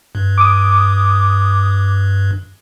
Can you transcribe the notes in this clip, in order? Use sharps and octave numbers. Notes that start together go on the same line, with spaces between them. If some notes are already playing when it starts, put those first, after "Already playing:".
G2
D6 D#6